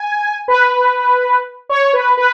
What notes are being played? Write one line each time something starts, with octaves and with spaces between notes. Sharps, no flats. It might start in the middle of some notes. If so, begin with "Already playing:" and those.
Already playing: G#5
B4
C#5
B4
B4